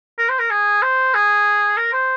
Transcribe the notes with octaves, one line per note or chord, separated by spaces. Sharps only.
A#4
C5
A#4
G#4
C5
G#4
A#4
C5